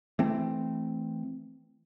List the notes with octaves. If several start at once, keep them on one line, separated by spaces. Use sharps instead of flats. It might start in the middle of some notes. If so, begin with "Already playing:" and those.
E3 A3 C4